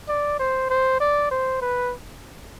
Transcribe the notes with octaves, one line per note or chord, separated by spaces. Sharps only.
D5
C5
C5
D5
C5
B4